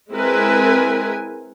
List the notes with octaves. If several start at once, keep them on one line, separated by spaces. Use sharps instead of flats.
G#3 C4 E4 A#4 B4 G#5